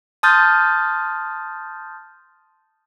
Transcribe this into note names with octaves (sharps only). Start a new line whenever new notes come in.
A5 C6 D#6 F6 G6 A6